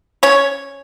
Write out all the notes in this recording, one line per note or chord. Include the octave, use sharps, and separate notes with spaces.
C#4 C#5